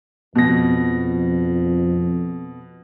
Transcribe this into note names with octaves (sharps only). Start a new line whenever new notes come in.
F2 B2 A#6